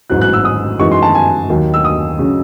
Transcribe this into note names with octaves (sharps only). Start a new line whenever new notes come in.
A1 G#2 F#3 F#6
F#6
E6
D#6
F#2 E3 G#3 D#4 F#4 C#6
C6
A5
G#5
D#2 D#3 F#3
E6
D#6
C#3 F#3 C#4